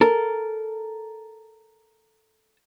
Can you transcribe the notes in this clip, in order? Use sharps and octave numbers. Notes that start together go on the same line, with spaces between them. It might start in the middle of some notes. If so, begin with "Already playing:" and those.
A4 A#4